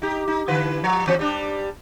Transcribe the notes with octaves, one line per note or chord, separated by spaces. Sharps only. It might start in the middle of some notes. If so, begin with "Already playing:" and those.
D#4 G4
D#4
D3 E3 B4
F3
E3 C4
G3 D4